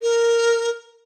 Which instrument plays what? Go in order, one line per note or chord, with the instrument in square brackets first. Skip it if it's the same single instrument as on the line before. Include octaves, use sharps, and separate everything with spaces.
[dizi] A#4